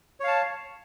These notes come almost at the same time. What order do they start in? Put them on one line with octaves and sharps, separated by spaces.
C#5 F5 A5